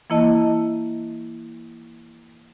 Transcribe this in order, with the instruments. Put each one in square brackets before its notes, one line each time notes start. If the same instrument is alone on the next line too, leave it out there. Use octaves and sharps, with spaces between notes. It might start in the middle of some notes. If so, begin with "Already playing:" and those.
[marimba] E3 A#3 E4 D#5 A5